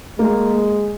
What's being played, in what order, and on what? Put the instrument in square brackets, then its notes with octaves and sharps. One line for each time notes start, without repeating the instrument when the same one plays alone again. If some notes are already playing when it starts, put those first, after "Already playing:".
[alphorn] G#3 [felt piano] A#3